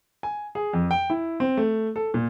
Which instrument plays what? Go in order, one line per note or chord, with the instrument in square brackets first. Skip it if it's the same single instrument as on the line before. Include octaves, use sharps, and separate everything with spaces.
[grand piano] G#5
G#4
F2
G5
E4
C4
A3
A4
A#2